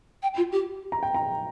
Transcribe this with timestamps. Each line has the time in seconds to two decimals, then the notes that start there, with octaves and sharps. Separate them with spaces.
0.23 G5
0.37 F4
0.52 G4
0.92 A#5
1.03 G5
1.15 A#5